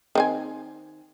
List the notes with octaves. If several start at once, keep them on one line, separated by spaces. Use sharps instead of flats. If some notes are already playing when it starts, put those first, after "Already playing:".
D#3 C4 G#5